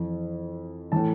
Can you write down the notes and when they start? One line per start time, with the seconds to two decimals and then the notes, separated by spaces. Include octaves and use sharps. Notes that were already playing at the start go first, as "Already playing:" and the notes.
Already playing: F2 E3
0.92 A2 E3 A5